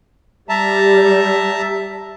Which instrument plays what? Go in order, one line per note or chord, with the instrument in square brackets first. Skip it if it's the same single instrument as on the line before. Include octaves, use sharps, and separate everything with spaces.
[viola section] G3 [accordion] E5 A5 A#5